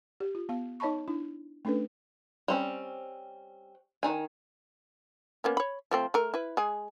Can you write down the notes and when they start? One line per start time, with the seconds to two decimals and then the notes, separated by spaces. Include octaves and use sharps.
0.20 G4
0.35 F4
0.49 B3 F5
0.80 D#4 C#5 D#5 A5 B5 C#6
1.08 D4 E4
1.65 A3 C#4 D4 A4 B4
2.48 G3 C4 C#4
4.03 D#3 D#4 G#5
5.44 A#3 B3 C#4
5.57 C#5 B5
5.91 F3 A3 C4
6.14 A3 A#4
6.34 E4 B4
6.57 G#3 G#4